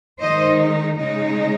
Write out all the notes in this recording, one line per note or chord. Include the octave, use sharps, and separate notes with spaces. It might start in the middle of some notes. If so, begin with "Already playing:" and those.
D#3 G#3 D#4 C5 D#5
C#3 G#3 D#4